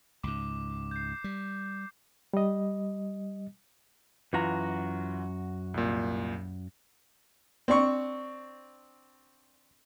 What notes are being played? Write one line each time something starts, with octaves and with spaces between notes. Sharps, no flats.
C#2 G#2 D6
G6 C7
G3
G3 D#5
F#2 E3 F4 F#4 A#5 A#6
C2 A#2
C4 D4 C#6